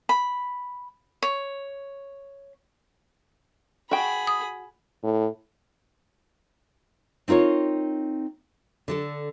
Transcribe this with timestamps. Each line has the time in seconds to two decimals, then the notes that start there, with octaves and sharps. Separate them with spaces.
0.09 B5
1.22 C#5
3.91 F#4 G#4 G5 B5
4.27 D#6
5.03 A2
7.28 C4 D#4 F4 A#4 C#5
8.88 D3 D4 A4